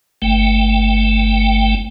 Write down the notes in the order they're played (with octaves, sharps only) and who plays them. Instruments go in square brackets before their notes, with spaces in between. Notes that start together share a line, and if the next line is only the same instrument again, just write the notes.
[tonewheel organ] G1 A3 G5